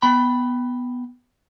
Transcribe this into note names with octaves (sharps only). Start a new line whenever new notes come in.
B3 G5 B5